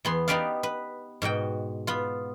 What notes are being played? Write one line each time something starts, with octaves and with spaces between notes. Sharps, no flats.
E2 B3 C6
B3 D#4 G4 B4 D5 F5
B4
G#2 B2 F#4 G5
B3 F4